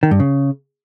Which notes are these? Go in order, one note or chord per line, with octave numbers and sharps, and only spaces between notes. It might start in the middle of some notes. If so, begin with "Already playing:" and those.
D#3
G2
C#3